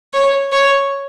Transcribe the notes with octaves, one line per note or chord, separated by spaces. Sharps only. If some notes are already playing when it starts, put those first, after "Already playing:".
C#5
C#5